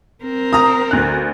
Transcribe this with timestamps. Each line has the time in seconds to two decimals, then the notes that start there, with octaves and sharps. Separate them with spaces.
0.23 C4 A#4
0.53 A#5 D#6
0.91 D2 F#6